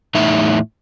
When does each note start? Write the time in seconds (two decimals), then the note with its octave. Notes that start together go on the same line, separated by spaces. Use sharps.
0.15 E2 A2 D#4 E5